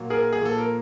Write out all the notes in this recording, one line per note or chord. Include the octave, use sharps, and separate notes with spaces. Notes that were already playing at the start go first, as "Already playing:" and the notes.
Already playing: A#2 F#3 A#3
G#4 A#4
G#4
A#2 F3 A#3 A4
A#4